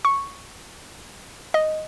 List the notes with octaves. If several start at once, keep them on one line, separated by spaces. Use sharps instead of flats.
C#6
D#5